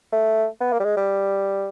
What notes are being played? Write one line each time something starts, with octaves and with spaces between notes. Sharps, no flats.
A3
B3
A#3
G3
G#3
G3